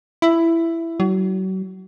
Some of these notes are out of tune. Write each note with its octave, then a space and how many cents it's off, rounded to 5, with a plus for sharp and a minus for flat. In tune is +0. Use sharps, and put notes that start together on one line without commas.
E4 +10
F#3 +35